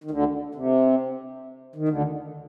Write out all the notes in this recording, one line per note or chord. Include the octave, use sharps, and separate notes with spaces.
D#3
D2 D3
C3
D#3
D2 D3